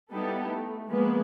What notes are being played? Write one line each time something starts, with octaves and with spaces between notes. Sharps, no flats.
G3 B3 D#4 E4 G4 A4
A3
F3 G#3 A#3 B3 B4